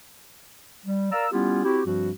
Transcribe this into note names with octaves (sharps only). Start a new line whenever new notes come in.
G3
A#4 D5 F5 A#5 E6
G3 B3 C#4 E4 F4 G4
C4 E4 F#4 G4
G2 F3 G3 C4 F#4